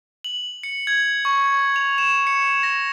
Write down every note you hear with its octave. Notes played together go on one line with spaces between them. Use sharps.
F#7
C#7
G#6
C#6
F7
E7
C#7
A#6